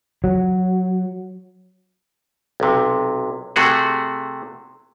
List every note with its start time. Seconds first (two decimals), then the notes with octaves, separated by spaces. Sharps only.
0.24 F#3
2.60 B1 C3
3.56 C3 A3 F#4 G#4